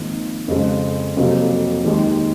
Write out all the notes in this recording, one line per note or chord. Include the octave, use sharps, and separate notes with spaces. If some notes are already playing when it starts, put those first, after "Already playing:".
Already playing: G#1 G#2 F3 A#3 D#4
F2 C#3 G#3
F1 F2 C3 F#3 A#3
D#2 D#3 G#3 D#4